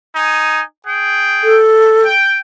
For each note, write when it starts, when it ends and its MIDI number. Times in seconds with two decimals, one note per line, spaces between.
0.14 0.62 63
0.14 0.62 80
0.86 1.57 68
0.86 1.57 79
1.43 2.04 69
2.04 2.37 79